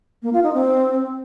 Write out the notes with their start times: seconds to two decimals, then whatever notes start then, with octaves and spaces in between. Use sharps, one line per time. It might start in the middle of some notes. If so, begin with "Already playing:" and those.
0.23 A#3
0.33 F4
0.44 D#4
0.54 C4